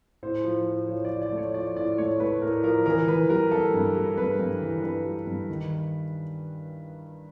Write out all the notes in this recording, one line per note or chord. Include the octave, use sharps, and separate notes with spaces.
A2 C5
F3
A2
F3 C#5
D5
F3
D5
A3
C#5
F3 D5
A2 D5
A3 C#5
A3 B4
A2 A#4
F3 A#4
E3 A#4
E3 B4
G3 A#4
G3 A4
G2
G3
G2 B4
G2
E3
G2 B4
G3
G2
D#3